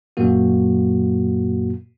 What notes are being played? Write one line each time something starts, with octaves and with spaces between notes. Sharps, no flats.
F#2 A#2 F#3 A#3 F#4